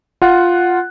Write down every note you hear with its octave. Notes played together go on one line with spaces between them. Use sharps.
F4 F#5 F#6